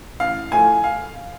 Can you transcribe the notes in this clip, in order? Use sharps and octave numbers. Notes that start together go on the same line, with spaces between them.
A1 F5
A2 F3 A3 G#5
F5